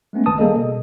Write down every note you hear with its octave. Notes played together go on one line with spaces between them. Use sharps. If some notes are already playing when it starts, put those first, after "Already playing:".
G#3 A3 B3 C#4
A1 D#3 B4 A5 D#6
G3 A#3 G#4 A4 D#5
B2